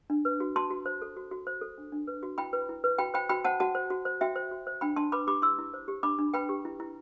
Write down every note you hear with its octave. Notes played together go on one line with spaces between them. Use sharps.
D4
B4
F#4
F#4 A5 C6
F#4
C5
A4
F#4
F#4
C5
A4
D4
D4
B4
F#4
E4 G5 B5
B4
E4
B4
F#4 G5 B5
C5 G5 B5
F#4 G5 B5
C5 F#5 A5
F#4 F#5 A5
C5
F#4
C5
F#4 E5 G5
C5
F#4
C5
D4 G5 B5
D4 A5 C6
B4 B5 D6
G4 B5 D6
E4 C6 E6
E4
C5
G4
D4 B5 D6
D4
B4 G5 B5
G4
E4
E4